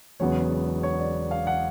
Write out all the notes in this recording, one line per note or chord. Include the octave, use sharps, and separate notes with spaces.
E1 E2 C#3 F#3 B3 C#5
C#5
D5
F5
F#5